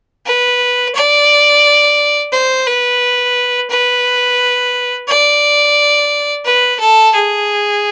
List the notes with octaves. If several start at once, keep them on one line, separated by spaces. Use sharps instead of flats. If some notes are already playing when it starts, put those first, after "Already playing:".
B4
D5
C5
B4
B4
D5
B4
A4
G#4